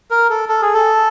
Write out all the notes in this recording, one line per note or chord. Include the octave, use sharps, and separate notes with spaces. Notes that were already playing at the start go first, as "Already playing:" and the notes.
A#4
A4
A4
G#4
A4